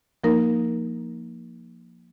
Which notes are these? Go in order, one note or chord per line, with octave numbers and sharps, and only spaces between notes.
F3 A#3 D#4 A#4